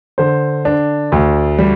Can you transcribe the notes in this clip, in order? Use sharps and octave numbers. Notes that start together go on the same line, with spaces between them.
D3 C5
D4
D2
G3